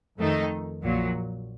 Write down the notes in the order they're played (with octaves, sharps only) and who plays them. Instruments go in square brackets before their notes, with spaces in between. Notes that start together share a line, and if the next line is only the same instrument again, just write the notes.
[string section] F2 D#3 A3 D#4
A#1 A#2 F#3